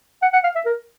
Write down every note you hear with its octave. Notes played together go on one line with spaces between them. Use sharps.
F#5
F#5
F5
E5
A#4